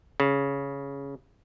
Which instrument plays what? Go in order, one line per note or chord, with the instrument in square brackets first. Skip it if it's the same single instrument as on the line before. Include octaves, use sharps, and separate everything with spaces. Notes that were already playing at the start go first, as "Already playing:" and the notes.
[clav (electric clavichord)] C#3